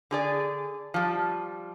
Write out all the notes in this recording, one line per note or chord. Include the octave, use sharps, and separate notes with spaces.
D3 G#4 D5
F3 G3